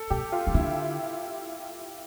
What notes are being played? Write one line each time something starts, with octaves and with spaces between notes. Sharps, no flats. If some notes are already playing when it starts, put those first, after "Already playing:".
Already playing: A4
B2 G4
F4
E3
D3 E4